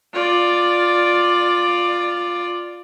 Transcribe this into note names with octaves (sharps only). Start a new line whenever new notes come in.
F4 D5